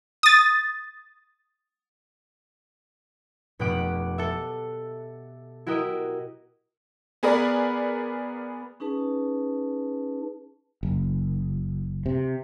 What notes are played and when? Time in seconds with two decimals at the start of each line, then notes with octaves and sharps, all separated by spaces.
0.23 D#6 A6
3.59 F1 B2 G4 F#5 D6 F#6
4.18 A4 E5
5.67 E4 F#4 G4 A#4 D#5 E5
7.23 B3 G#4 A#4 B4 D5
8.80 C#4 D#4 G#4 B4 A5
10.83 F#1
12.06 C3